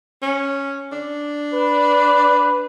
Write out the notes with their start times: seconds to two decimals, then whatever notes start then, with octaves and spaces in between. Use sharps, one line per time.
0.22 C#4
0.92 D4
1.54 B4